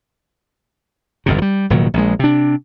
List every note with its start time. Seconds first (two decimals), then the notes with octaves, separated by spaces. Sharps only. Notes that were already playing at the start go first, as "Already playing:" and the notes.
1.26 G1 F2 C3
1.38 F3 G3
1.70 F1 A#2 D#3 F#3
1.94 A#1 G#3
2.19 C3 D4